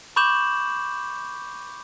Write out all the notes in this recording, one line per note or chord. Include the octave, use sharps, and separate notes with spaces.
B5 C#6 D6 G6 E7 F#7